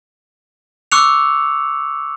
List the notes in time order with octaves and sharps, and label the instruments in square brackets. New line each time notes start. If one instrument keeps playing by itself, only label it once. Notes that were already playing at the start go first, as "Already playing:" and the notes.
[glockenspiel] C#6 D6 E6 F#6 C#7 F7